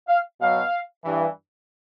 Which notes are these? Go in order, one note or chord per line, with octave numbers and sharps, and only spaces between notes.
F5
B2 F#3 F5
G2 E3